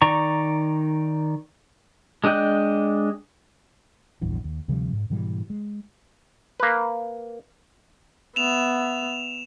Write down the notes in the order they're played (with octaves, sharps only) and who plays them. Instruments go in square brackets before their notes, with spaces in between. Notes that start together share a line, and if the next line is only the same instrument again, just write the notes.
[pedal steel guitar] D#3 D5 A#5 C#6
G#3 D4 D#5 G5 F#6
[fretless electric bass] A#1 E2 G2 E3
D#2
D2 C3 F3 G3
G#2
G#2 B2 E3 G3
G#3
[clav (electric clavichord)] A#3 B4
[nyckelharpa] B3 E5 [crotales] E7 F7